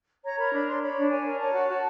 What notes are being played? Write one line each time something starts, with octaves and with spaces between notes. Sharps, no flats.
C#5 A#5
A#4 B5
D4 B5
C#5 C6
C#5 B5
D4
C#5 G#5
A#4
C#5 A5
F#4
F#4